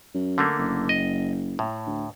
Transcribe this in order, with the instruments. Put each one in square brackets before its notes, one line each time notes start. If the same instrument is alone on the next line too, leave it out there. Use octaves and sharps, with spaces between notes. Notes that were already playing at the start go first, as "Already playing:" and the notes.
[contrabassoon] F#2
[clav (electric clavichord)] D3 A3 A#3
[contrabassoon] F#1
[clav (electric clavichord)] D#5
A2
[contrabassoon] D2